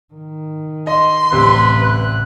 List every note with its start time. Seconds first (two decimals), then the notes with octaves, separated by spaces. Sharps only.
0.14 D#3
0.87 D#5 C6
1.32 A1 D2 C3 E3 B4
1.83 F#6